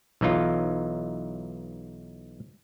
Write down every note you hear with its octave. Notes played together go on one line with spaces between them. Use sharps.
B1 E3 D#4 F4